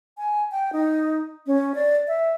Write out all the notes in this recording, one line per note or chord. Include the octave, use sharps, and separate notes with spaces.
G#5
G5
D#4
C#4
D5
E5